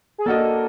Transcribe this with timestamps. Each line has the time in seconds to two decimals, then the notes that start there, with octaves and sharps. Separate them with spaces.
0.18 G#4
0.26 A#3 D4 F#4 A4 A#4 D#5